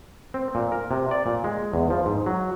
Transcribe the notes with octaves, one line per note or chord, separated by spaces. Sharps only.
C4
A#2
A#4
C3
D5
A#2
G#3
E2
F3
G#2
F#3